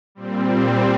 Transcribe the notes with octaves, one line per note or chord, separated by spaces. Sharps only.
A#2 G3 C4